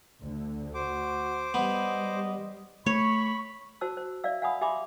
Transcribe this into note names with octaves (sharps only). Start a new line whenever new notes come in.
D2 D3
F#4 C5 D6
G3 B3 D#5
A3 C#5 B5 C#6
F#4 C5 A5 E6
C5
D5 E5 F5 E6
F5 F#5 G#5 B5 D#6
G4 E5 G#5 B5 C6 D6